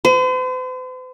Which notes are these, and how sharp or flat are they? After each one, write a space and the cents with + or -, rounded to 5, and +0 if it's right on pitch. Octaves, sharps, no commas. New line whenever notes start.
C5 -45